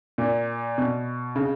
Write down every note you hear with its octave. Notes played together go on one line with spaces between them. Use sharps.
A#2
B2
C#3